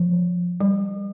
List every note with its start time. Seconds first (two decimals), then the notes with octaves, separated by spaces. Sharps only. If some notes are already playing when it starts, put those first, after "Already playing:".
Already playing: F3
0.61 G3